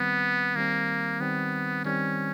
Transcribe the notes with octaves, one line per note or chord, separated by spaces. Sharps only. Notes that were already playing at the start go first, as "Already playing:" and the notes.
Already playing: D#3 G3 B3 C4
D#3 G3 A#3 C4
D#3 G3 B3 C4
D#3 G3 C4 C#4